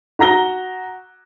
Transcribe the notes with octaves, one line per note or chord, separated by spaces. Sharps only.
F#4 A#5 A#6 G7